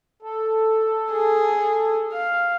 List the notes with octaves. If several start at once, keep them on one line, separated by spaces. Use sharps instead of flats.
A4
G#4
F5